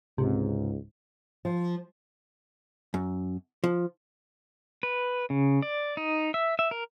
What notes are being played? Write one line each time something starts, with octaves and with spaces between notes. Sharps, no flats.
C#2 G#2 C3
F3
F#2
F3
B4
C#3
D5
D#4
E5
E5
A#4